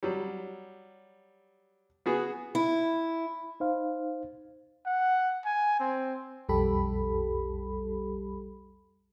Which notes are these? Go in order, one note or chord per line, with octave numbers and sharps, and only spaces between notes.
F#3 G3
B3 F#4 G#4
E4
D#4 C5 F5
F#5
G#5
C4
B1 F2 G3 G4 A4 B5